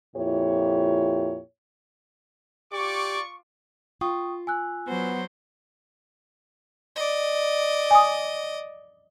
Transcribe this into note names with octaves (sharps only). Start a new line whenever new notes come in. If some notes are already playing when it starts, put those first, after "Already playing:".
F2 A#2 E4 G4 C#5
F4 G4 D5 C#6 D6
F4 G5 C#6 D#6
G#5 E6 F#6
F#3 B3 C5
D5 D#5
G#5 D#6